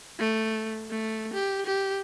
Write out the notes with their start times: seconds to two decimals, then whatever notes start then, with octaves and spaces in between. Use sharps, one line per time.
0.19 A3
0.90 A3
1.34 G4
1.66 G4